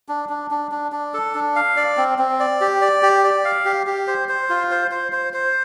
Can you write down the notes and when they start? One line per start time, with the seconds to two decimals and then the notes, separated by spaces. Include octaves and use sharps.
0.09 D4
0.29 D4
0.51 D4
0.71 D4
0.92 D4
1.14 A4
1.35 D4
1.56 F5
1.77 D5
1.97 C4
2.19 C4
2.40 D5
2.61 G4
2.81 D5
3.02 G4
3.24 D5
3.45 F5
3.65 G4
3.87 G4
4.07 C5
4.29 C5
4.49 F4
4.71 C5
4.91 C5
5.12 C5
5.33 C5